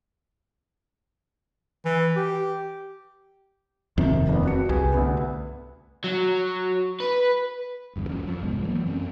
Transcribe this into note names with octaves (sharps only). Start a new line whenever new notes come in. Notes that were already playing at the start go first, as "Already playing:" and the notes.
E3
G4
D#1 F2 C3 D#3 F3
E1 B3
C4 F#4 C#7
C2 G4 G#4 B4
D2 B3
F#3
B4
G1 E2 G2
F2 F3 C#4
F2 F3
C2 G#2 G#3 B3
E3 F#3 A#3
F#2 C4 C#4